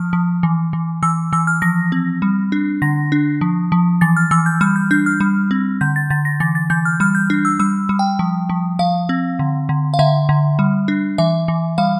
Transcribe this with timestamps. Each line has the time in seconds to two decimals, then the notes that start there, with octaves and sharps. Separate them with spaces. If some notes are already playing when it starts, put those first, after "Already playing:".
Already playing: F3 F6
0.13 F3
0.43 E3
0.73 E3
1.03 E3 E6
1.33 E3 E6
1.47 F6
1.62 F3 A#6
1.92 C4
2.22 G3
2.52 D4
2.82 D3 A#6
3.12 D4
3.41 F3
3.72 F3
4.01 E3 A6
4.17 F6
4.31 E3 E6
4.46 G6
4.61 G3 F6
4.76 G6
4.91 D4 G6
5.06 F6
5.20 G3
5.51 C4
5.81 D3 G6
5.96 A6
6.10 D3 A6
6.25 A#6
6.40 E3 A6
6.55 A6
6.70 E3 G6
6.85 F6
7.00 G3 F6
7.15 G6
7.30 D4
7.45 E6
7.59 G3 E6
7.89 G3
7.99 G5
8.19 F3
8.49 F3
8.79 F3 F5
9.09 C4
9.39 D3
9.69 D3
9.94 F5
9.99 D3 E5
10.29 D3
10.59 G3
10.88 D4
11.18 E3 E5
11.48 E3
11.78 G3 F5